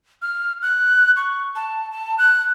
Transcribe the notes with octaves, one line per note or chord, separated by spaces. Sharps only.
F6
F#6
C#6
A5
A5
F#6